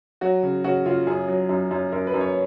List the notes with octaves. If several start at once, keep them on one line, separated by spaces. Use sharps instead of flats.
F#3 F#4
C#3
C#3 F#4
C#3 F4
F#2 G#4
F#3
F#2
F#2
F#2 A#4
B4
F#2
C#5